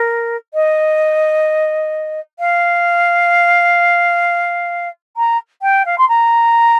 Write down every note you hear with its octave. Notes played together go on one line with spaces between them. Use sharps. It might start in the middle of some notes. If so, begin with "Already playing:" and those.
Already playing: A#4
D#5
F5
A#5
G5
F5
C6
A#5